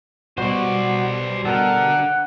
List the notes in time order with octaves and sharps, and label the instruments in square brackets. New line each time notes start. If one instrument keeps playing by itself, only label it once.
[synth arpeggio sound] B2 G3 [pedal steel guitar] F#4 [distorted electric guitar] C5 D5
[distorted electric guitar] D3 [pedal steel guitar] A4 A#4 [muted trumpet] F#5